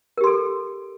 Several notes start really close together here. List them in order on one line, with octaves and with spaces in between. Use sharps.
A#4 G4 C6 A4